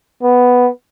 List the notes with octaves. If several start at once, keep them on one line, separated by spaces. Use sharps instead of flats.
B3